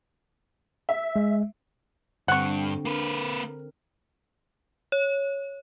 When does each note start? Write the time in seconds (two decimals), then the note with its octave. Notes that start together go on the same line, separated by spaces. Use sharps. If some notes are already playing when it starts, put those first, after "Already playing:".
0.89 E5
1.16 G#3
2.28 G2 D3 C4 F#5 C#6
2.85 A#3 A#4 B4
4.92 C#5